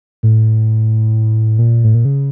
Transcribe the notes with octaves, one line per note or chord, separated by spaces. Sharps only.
A2
A#2
A2
A#2
C#3